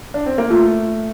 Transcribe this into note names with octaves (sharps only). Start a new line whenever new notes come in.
D4
C4
A#3
A3 F4